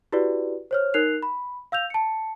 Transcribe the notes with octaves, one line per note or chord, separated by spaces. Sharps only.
E4 F#4 G4 B4 D5
C5 C#5 F6
D#4 A#4 F#6 C7 F7
B5
F5 E6 G6 F7
A5 C#7